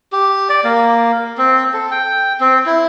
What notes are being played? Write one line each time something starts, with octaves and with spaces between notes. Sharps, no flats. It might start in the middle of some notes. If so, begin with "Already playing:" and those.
G4
D5
A#3
C4
A4
G5
C4
E4